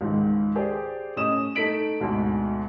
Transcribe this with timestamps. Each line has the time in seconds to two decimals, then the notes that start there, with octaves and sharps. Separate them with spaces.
0.01 C#2 G#2 D#3
0.55 G4 G#4 C5 D5
1.16 A2 C#4 D#5 D#6 E7
1.55 A3 D#4 B6 D7 F#7
2.00 D2 G#2 B2